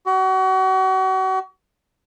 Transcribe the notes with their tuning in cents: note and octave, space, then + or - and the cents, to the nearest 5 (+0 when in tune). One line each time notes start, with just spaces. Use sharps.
F#4 +35